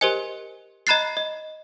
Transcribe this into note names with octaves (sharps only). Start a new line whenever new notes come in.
G4 A#4 C5 D#5 G#5
D#5 A#5 B5 F#6 A6 C7
D#5